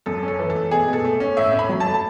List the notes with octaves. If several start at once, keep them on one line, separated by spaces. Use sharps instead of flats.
F#2 A4
C#4
A4
E3
A3 A4
B2 G#4
B2
A4
A3
C#4
A2 E5
C#4
B5
F#3
A5
A3
A5